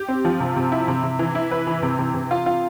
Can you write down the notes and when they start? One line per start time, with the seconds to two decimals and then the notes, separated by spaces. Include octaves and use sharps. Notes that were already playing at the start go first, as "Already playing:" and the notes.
Already playing: G4
0.08 C4
0.25 F3
0.40 C3
0.56 C3
0.72 E4
0.88 C3
1.03 C3
1.19 E3
1.35 E4
1.51 B4
1.67 E3
1.82 C3
1.99 C3
2.14 C3
2.31 F4
2.46 F4